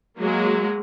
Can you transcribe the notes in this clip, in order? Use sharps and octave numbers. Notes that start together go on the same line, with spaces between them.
F#3 G#3 A#3